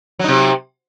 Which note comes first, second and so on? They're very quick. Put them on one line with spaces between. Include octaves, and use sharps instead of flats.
F#3 D#4 C3